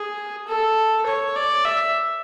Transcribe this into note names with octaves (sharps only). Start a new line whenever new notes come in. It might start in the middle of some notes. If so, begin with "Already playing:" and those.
Already playing: G#4
A4
C#5
D5
E5